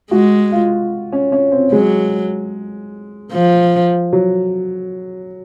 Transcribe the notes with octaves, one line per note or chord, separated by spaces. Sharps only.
G#3 F#4
F4
C#4
C#4
C4
F#3 G#3
F3
F#3